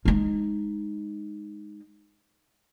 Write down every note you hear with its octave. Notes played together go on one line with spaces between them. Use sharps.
G#3 D#4